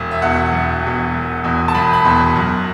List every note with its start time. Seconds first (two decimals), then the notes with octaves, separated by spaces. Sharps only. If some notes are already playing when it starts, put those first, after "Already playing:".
Already playing: E1
0.11 E5
0.22 E2 B2 F#5
0.53 E1
0.83 E2 B2
1.13 E1
1.44 E2 B2
1.68 A5
1.74 E1 B5
1.93 B5
2.05 E2 B2 C6
2.36 F#2